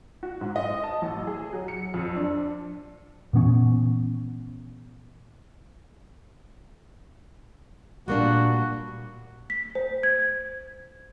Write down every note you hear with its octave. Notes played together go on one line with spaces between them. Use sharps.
F#4
G#2
D#5
A5
A1
G#4
F#3
C#7
F2
D4
A#2 E3 B3 C#4
A#2 G3 A#3 D4 F#4
B6
C5
G#6